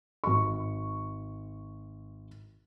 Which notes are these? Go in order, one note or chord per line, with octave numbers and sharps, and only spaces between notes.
G#1 C#6